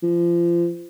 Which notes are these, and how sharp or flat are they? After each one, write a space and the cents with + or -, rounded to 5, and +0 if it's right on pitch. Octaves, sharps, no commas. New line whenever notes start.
F3 -30